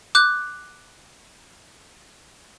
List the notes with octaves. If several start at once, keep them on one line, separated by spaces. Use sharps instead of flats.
D6 F#6 G6